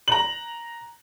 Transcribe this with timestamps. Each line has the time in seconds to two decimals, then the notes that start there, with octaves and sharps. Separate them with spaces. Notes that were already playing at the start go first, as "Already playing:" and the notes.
0.08 A#5 F#7